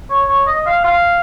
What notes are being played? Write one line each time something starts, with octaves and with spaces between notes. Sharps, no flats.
C#5
C#5
D#5
F5
F5